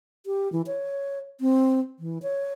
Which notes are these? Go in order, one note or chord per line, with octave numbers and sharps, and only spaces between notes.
G4
E3
C#5
C4
E3
C#5